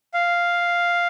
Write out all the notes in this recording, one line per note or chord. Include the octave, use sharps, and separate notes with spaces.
F5